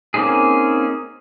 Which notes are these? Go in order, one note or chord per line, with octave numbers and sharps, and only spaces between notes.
A#3 C4 C#4 D#4 G#4